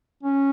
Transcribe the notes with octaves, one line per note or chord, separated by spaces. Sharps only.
C#4